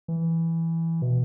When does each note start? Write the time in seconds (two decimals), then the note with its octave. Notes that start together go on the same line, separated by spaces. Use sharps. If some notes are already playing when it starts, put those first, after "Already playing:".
0.08 E3
1.02 B2